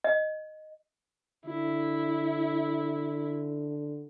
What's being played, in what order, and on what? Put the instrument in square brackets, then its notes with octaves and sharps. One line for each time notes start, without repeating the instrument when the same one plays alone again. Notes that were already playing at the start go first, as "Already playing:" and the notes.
[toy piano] D#5
[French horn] D3 [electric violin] E4